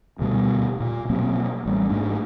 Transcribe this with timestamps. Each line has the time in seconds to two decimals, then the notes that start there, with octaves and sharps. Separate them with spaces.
0.19 D#1 D2 B2 G3
0.80 A#2
1.10 B2 F#3 A#3 C4
1.66 A1 G3
1.90 G#2 A3 D4